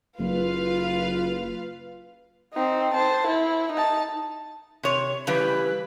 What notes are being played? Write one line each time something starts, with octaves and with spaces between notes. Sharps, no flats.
F#1 F4 B4 F5
C4 D#4
C5 A5
E4
D#4 A5
C3 C#5
C#3 E3 G3 B4